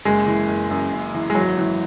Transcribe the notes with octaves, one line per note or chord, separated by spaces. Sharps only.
F#1 G#3
E3
F#1
F#2
F#1
E3
G#3
G#1 F#3
E3